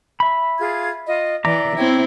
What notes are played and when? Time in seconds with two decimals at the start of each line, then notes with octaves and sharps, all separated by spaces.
0.20 E5 B5
0.60 F4 G#4 G#6
1.08 F4 D#5
1.45 E3 D5 E5 A#5 D6
1.76 C4 E4 C#5 G5